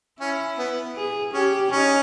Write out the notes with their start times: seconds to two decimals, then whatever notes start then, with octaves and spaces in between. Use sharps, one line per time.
0.20 C#4 E4
0.58 B3
0.96 G#4
1.33 C#4 G4
1.71 C#4 D#4